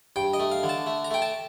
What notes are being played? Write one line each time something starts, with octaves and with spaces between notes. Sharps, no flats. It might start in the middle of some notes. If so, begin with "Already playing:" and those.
G2 G5
D#5
A3
F5
D3
A5
A3
A#5
A3 G5
A5